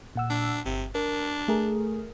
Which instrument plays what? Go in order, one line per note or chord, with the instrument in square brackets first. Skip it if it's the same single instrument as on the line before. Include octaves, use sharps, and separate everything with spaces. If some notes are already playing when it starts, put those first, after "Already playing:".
[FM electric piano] A#2 F#5 E6
[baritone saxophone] D4
[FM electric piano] G1 [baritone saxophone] C3
[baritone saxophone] D4 [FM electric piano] A#4
[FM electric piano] A3 G#4 A#4